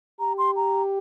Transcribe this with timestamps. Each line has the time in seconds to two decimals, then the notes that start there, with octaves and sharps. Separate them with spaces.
0.20 G4 A#5
0.38 C6
0.56 A#5